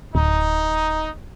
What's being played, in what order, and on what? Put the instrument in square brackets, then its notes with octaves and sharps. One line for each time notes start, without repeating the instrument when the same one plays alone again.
[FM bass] D1 [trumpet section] D#4